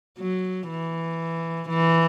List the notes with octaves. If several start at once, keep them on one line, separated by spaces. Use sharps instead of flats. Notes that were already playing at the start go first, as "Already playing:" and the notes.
F#3
E3
E3